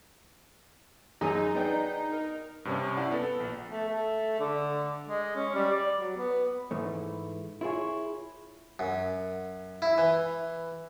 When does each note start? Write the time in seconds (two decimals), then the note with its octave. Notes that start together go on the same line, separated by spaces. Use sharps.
1.21 F#2 D#4 G#4 G#5 D#6
1.55 B3 D4 G5
2.12 A#4
2.65 G2 C3 C#4
2.97 E4 D5 F#5
3.11 B3 A4
3.40 A#1
3.70 A3
3.88 A3
4.40 D3
5.08 G#3
5.35 C#4
5.54 G3
5.71 D5
5.98 F#3
6.16 B3
6.71 G#2 E3 A3
7.61 E4 F4 G#4 C#5
8.79 F#2
9.82 E4
9.98 E3